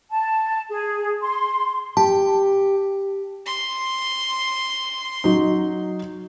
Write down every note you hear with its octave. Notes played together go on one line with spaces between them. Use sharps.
A5
G#4
C6
G4 A5
C6
F#3 D#4